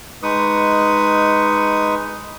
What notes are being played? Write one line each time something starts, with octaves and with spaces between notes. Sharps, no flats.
G#3 D#4 B4 C#6 D#6